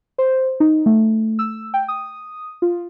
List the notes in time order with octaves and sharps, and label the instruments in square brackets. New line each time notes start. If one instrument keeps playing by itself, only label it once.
[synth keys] C5
D#4
A3
E6
G5
D#6
F4